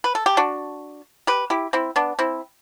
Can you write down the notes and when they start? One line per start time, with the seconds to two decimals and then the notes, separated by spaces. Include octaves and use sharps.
0.04 B4
0.15 A4
0.26 G4
0.37 D4 F#4
1.27 G4 B4
1.50 E4 G4
1.73 C4 E4
1.96 B3 D4
2.19 C4 E4